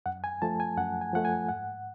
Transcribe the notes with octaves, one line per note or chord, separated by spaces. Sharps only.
F#2 F#5
G#5
F3 A3 A5
G#5
F#2 F#5
G#5
F3 A3 F#5
G#5
G#2 F#5